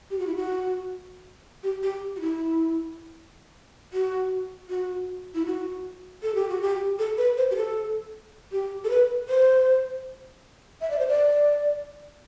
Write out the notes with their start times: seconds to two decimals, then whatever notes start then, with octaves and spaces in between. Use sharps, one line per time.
0.11 G4
0.19 F#4
0.27 E4
0.35 F#4
1.64 G4
1.83 G4
2.16 F#4
2.21 E4
3.93 F#4
4.69 F#4
5.35 E4
5.46 F#4
6.23 A4
6.35 G4
6.49 F#4
6.62 G4
6.99 A4
7.18 B4
7.37 C5
7.51 G4
7.56 A4
8.52 G4
8.84 A4
8.90 B4
9.29 C5
10.81 E5
10.90 D5
10.99 C5
11.08 D5